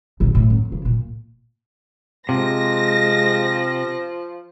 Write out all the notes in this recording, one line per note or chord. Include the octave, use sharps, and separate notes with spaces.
A#1 D#2
A2
F#2
C#3 F3
A#2
C3 F3 G#3 A#6